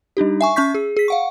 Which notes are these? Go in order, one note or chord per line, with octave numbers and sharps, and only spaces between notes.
G3 D4 D#4 G4
E5 G#5 C#6
C#4 E5 C#6 G6 B6
G#4
G#4 B6
F5 F#5 C#6